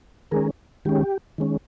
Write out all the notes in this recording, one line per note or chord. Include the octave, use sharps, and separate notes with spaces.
D#3 G#3 C#4 G#4 A#4
D#3 G#3 C#4 G4
D#3 G#3 C#4